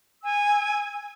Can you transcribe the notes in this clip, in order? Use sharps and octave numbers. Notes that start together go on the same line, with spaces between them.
G#5 E6